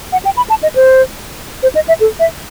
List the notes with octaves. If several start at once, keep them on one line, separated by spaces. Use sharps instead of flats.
F#5
G5
B5
A5
D#5
C5
C5
D#5
E5
A4
E5